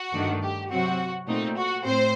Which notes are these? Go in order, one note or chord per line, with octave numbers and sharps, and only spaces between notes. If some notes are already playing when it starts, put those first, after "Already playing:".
Already playing: F#4
G2 D#3 A3 D4
G4
C3 F#3 C4 F#4
A#2 A3 C4 D#4
F#4
A2 C4 C5